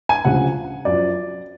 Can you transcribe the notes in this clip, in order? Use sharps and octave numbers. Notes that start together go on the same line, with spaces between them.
G#5
D2 C#3 F3 F#5
F#2 F3 D5